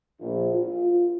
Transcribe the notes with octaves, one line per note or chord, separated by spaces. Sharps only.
A#1
F4